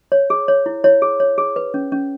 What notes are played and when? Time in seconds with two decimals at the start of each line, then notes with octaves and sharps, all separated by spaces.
0.12 C#5
0.30 G#4
0.48 C#5
0.66 E4
0.84 E4 C#5
1.02 G#4
1.20 C#5
1.38 G#4
1.56 B4
1.74 C#4
1.92 C#4